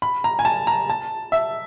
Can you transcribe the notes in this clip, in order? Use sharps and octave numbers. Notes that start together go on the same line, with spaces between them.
B5
A#5
G#5
A5
A#5
A5
E5